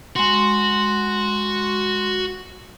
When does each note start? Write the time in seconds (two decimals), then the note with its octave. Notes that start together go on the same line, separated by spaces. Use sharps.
0.16 G#3 F#4 C6